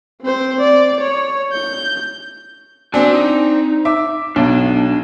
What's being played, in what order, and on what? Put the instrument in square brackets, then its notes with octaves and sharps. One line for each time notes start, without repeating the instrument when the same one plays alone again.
[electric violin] C4 C5
D5
C#5
G6
[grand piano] C4 D4 [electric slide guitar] F#4 G#5
[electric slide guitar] D#4
[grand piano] E5 D6
[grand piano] B1 [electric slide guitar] D4